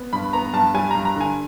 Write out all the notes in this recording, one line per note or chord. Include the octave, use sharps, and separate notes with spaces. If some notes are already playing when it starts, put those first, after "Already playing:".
Already playing: B3
G2 B5
B3 A#5
G2 A5
G3 G#5
G2 A#5
A#5
D3 G#5